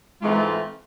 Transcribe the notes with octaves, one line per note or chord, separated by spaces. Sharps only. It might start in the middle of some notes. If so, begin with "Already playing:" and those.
G#2 E3 G#3 A3 C4 F4